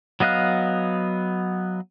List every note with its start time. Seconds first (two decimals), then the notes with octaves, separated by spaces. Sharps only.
0.20 F#3 B3 D#5 F5 F#6